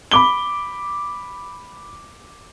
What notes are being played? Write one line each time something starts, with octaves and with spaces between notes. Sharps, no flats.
B5 D6 G7